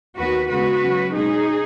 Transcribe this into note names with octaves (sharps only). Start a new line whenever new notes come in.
D#2 D#3 B3 F#4 B4
C#3 G#3 B3 F#4 B4
C#3 F#3 C#4
B2 G#3 C#4 D#4 G#4